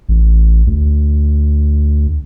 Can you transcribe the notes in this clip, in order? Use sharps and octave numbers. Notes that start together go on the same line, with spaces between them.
A1
D2